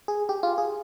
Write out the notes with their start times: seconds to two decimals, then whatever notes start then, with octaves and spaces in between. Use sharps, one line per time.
0.08 G#4
0.29 G4
0.43 F4
0.58 G#4